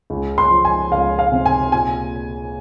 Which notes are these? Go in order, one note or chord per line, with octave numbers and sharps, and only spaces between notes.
C#2
C6
F3
G#5
C#2 F5
F5
C3
G#5
A#2 G#5